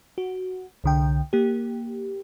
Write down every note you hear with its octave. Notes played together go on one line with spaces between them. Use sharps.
F#4
C2 D3 G5
A#3 G4